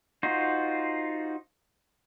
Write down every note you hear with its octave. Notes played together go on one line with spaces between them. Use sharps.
D#4 F4 F#4 C5